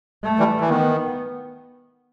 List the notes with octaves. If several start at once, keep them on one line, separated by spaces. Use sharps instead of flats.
A3
E3 G3
E3
D#3 B3